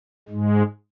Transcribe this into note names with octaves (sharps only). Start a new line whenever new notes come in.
G#2 G#3